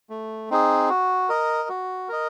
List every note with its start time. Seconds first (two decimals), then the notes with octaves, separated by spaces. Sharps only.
0.10 A3
0.50 C4 D#4 G#4
0.89 F#4
1.29 A#4 D#5
1.69 F#4
2.09 A#4 D#5